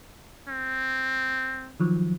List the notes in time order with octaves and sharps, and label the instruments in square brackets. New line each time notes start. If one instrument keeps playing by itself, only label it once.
[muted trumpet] C4
[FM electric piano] D#3 F3 F#3